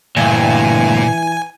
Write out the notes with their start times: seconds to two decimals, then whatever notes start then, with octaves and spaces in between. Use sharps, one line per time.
0.17 D2 G2 A#2 E3 G#5